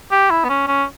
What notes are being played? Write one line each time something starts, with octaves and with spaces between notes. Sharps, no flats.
G4
E4
B3
C#4
C#4